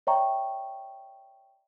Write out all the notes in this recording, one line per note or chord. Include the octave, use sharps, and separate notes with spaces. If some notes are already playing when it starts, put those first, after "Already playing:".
C#5 D5 E5 G5 A#5 C#6